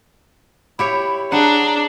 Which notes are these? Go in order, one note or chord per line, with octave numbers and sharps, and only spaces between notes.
E4 G4 C#5 B5
D4 G#4 F#5 A#5